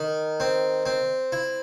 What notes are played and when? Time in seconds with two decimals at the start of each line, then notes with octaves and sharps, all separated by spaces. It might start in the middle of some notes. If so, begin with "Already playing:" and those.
Already playing: D#3
0.40 C4
0.86 C4
1.32 E4